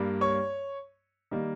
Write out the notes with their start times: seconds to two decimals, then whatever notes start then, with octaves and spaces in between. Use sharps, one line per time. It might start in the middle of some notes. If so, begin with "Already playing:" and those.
Already playing: G2 G3 A#3
0.21 C#5 C#6
1.31 D#3 G3 A#3